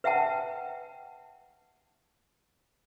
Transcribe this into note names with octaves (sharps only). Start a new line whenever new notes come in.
B4 E5 F#5 G5 A5